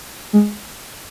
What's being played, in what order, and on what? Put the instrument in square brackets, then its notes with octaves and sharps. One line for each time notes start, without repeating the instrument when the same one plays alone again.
[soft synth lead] G#3